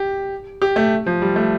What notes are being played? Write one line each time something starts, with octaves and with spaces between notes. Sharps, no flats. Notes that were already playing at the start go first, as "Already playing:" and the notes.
Already playing: G4
G4
A3
F3
G3
A3